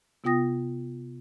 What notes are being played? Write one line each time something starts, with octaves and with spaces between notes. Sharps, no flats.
C3 B3 F4 G5 D#6 A#6